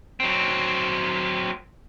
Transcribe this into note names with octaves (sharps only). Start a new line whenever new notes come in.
F#3 C4